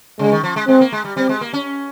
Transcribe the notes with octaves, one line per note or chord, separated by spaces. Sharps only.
C#3 G#3
D#3
F3
G#3
G#3 C4
A#3
G#3
G3
G3 C4
G#3
A#3
C#4